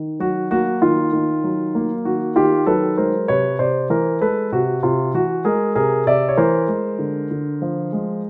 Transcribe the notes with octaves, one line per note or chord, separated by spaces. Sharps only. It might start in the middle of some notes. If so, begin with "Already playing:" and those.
Already playing: D#3
F#3 F#4
A#3 F#4
D#3 F4
D#3
F#3
A#3
D#3 F#4
D#3 F4 G4
F#3 A4 B4
G#3 A#4 C5
C3 B4 C#5
C3 C5 D5
E3 A#4 C5
G#3 A4 B4
C3 F#4
C3 F4
E3 F#4
G#3 G#4 A#4
C3 G#4 A#4
C3 D5 E5
C#5
E3 A#4 C5
G#3
D3
D3
F3
G#3